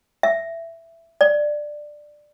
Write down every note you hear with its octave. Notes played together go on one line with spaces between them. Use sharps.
E5
D5